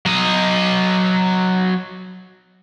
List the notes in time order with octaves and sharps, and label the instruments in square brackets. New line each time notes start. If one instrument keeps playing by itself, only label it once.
[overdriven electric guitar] F#3 D#5